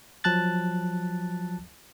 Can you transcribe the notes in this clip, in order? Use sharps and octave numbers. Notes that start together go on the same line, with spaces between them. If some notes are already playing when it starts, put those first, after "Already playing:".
F3 F#3 A5 F#6 A6